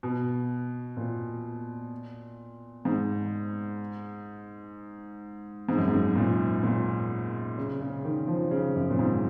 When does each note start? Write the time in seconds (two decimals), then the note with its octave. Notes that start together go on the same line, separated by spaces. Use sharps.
0.03 B2
0.97 A#2
2.85 G#2
5.69 G#2
5.78 F#2
5.88 G#2
6.15 A#2
6.63 A#2
7.58 C#3
7.81 C#3
8.05 D#3
8.27 F3
8.51 C#3
8.75 F#2
8.90 A#2
8.99 G#2